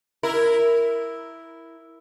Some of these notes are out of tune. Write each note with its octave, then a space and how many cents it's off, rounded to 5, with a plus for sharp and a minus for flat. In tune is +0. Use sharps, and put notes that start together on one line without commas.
E4 +0 A#4 +0